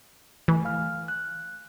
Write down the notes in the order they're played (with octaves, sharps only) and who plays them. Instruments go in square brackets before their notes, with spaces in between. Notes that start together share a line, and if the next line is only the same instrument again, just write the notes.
[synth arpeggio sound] E3 [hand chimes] A3 G#5
[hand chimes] F5 F6
F#6